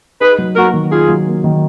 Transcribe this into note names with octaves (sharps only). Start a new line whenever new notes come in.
D#4 G#4 B4
F#3
A#3 F#4 A#4
D#3
D#4 F4 G#4
F#3
A#3
D#3